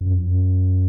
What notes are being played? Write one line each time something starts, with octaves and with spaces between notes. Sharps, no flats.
F#2
F2
F#2